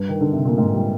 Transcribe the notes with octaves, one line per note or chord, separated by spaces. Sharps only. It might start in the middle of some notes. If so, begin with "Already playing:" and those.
Already playing: G2
D#3
D3
C3
A#2
G#2
G3